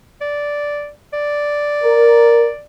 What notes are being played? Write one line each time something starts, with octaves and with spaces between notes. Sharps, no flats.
D5
D5
A#4